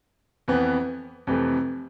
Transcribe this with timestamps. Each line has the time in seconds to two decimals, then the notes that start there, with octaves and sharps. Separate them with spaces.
0.48 F2 E3 B3
1.27 F2 C3 E3 A3